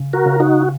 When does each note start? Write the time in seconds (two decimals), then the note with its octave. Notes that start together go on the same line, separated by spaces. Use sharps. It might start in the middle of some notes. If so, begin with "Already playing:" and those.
Already playing: C#3
0.13 F#4 A#4
0.26 C#3
0.40 D#4 F#4